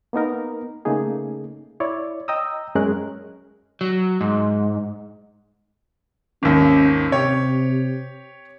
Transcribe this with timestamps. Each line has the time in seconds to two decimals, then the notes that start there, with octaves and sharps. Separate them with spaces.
0.13 A#3 B3 D#4 A#4
0.85 C#3 A3 A#3 D#4 G#4
1.80 E4 C#5 D5
2.28 D#5 G5 A#5 D#6 E6
2.75 F#2 G#3 C#4 G#4 A#4 F#6
3.81 F#3
4.21 G#2
6.43 G#1 D#2 C#4
7.12 C3 G4 C#5